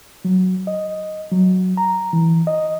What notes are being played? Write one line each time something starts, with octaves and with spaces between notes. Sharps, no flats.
F#3
D#5
F#3
A#5
E3
D#5